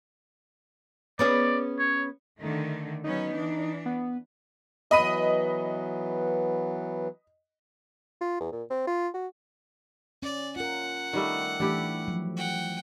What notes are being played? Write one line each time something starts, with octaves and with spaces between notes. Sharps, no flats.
B3 C#4 G#4 D5
C#5
D3 D#3 A3
F#3 B3 C#4 D#4
E3 D4
B3
E3 F#3 B3 D#5 B5 D#7
F4
E2
A#2
C4
F4
F#4
C#4 D5
F4 A#4 F#5
D#3 G3 A3
E3 A3 D4 E4 G4
F3 F#3
F#5 G5